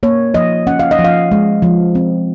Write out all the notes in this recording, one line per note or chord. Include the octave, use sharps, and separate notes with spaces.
A#3 C#5
F3 D#5
C#4 F#5
F5
D#5
F3
F5
G#3
F3
C4